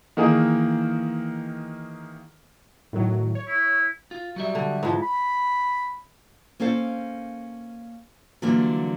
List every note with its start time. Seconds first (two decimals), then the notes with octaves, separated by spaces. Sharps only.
0.17 D#3 E3 A#3 G#4 A#4 D#5
2.93 A2 D#3 F#3
3.35 C#5
3.48 E4
4.11 F4
4.36 F#3 G3 E5
4.55 D3
4.83 G#2 E3 F3
5.02 B5
6.60 A#3 C#4 A4 C5 F5
8.42 D3 E3 F#3 G3 A#3 F4